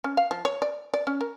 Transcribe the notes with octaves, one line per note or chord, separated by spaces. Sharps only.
C#4
F5
F3
C#5
D5
D5
C#4
A#4